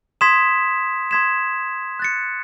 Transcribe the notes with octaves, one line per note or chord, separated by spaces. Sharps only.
C6 D#6 G#6 B6 E7
C6 D#6 G#6 B6 E7
F#6 A6 C#7